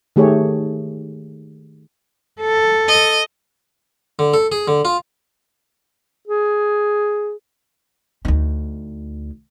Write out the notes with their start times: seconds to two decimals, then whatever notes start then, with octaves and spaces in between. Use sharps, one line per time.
0.16 D#3 A3 G4 G#4 C#5
2.41 A4
2.88 D#5
4.19 D3
4.34 A4
4.52 G#4
4.68 D3
4.85 F4
6.27 G#4
8.25 D2 D#4